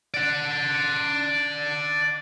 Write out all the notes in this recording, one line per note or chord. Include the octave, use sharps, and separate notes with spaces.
D5 F#5